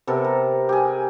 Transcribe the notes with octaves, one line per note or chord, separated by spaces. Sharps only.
C3 B3 A4 A#4
A#5
G4 G#4